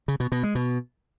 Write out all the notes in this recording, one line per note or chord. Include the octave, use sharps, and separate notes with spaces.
C#3
B2
B2
G#3
B2